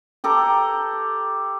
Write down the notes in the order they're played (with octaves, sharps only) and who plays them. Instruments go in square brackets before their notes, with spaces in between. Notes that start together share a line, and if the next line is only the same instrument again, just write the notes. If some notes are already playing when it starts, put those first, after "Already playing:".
[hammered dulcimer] G4 A4 A#5 D6